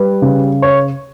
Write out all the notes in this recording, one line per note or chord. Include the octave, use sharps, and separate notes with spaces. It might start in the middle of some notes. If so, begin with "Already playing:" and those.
Already playing: G3 B4
C#3
C#5